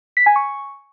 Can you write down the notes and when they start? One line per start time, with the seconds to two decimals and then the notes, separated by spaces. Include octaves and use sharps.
0.17 B6
0.26 G#5
0.36 C#6